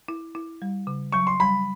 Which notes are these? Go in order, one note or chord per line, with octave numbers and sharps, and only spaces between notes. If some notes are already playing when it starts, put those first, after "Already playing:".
E4
E4
G3
C#3
F#3 C#6
C6
G3 B5